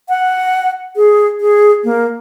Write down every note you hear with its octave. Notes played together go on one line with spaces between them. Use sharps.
F#5
G#4
G#4
A#3